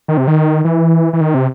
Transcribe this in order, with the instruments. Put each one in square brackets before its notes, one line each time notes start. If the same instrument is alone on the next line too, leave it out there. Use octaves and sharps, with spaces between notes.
[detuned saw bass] D#3
C3
D#3
E3
E3
D#3
C3